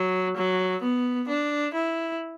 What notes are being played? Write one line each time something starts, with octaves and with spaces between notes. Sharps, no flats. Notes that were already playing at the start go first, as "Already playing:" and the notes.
Already playing: F#3
F#3
B3
D4
E4